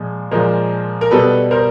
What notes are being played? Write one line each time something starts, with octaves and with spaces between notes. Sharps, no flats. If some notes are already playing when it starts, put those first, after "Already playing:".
Already playing: A#2 F3 G#3
A#2 F3 G#3 A#4 C5
A#4
B2 G3 B3 A4 B4
A#4 C5